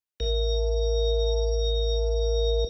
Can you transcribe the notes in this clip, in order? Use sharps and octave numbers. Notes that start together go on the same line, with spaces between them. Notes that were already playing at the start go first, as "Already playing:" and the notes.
A1 A#4